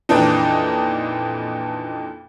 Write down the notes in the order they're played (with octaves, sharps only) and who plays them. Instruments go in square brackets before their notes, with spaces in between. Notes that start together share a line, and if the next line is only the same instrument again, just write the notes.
[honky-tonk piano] F2 A#2 E3 D4 D#4